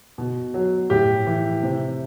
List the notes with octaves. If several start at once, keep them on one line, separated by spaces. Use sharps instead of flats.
B2
F#3
A2 G4
E3
C3